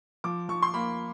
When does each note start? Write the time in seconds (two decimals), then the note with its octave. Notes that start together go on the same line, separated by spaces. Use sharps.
0.24 F3 D6
0.49 F3 C#6
0.62 C6
0.74 A#3 B5